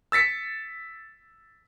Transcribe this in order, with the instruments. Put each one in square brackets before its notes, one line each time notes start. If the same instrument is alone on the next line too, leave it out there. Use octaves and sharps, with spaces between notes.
[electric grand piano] E6 A6 B6 C#7